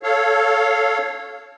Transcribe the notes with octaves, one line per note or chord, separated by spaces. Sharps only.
A4 C#5 F5